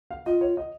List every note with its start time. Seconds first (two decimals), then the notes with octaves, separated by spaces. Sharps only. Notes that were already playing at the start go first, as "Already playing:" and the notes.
0.11 F5
0.26 F4 D#5
0.41 C#5
0.57 D#5